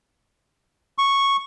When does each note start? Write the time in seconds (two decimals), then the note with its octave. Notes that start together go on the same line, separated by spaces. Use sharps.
0.98 C#6